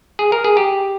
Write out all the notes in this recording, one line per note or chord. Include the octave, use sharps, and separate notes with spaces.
G#4
A#4
G#4
G4